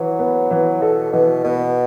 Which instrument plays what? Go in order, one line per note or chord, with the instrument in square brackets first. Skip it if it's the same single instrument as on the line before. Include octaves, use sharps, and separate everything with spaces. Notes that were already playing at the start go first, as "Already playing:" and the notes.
Already playing: [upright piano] E3 [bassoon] F#3
[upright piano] B3
E3
[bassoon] B2 [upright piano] A4
[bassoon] B2 [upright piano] E3
[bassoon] B2 [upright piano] B3